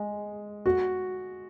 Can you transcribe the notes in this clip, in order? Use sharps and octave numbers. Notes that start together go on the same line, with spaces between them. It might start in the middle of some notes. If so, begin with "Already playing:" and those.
Already playing: G#3
F#4